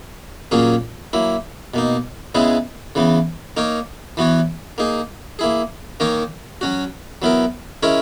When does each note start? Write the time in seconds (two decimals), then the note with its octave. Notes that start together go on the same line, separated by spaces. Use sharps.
0.51 A#2 F#3 A#3 C#4 G#4
1.13 F#3 A#3 E4
1.74 B2 A#3 D#4
2.35 C#3 G#3 B3 E4 G#4
2.95 C#3 E3 B3
3.57 A#3 D#4 A#4 C#5
4.17 E3 B3 F#4 C#5
4.78 A#3 D#4 G#4
5.39 A#3 E4 G#4
6.00 D#3 A#3 D#4 A#4 C#5
6.61 F#3 C#4 F#4
7.22 F#3 B3 E4 A#4
7.83 G#3 C#4 E4 A#4 C#5